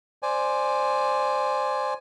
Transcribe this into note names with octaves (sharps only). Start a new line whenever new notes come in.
C5 D5 G#5